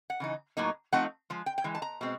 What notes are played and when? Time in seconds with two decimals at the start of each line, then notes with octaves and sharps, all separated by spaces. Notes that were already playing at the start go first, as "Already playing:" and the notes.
0.10 F#5
0.20 C#3 E3 D#4
0.57 A2 F#3 A#3 D#4
0.92 F3 A3 C4 D#4 F#5
1.30 F3 G#3
1.46 G5
1.58 G5
1.64 E3 G#3
1.75 A5
1.82 A#5
2.01 B2 G#3 C4